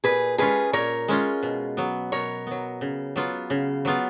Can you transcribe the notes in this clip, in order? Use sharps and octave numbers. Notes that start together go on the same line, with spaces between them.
A#2 G#4 B4
G#3 C#4 F4 G#4 B4
A#2 A#4 C#5
G#3 C#4 F4
B2
F#3 B3
B2 A#4 C#5
F#3 B3
C#3
F#3 B3 F4
C#3
F#3 B3 F4